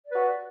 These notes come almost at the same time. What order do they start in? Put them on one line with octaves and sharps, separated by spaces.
D5 B4 F#4